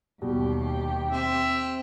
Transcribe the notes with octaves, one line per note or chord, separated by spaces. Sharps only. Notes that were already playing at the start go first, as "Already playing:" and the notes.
D#2 B2 G3 G4
C4 E5